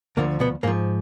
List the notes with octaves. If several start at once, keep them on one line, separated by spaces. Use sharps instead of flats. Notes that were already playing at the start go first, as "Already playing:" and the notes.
D2 D3 F3 A#3
B2 B3
G#2 F3 A#3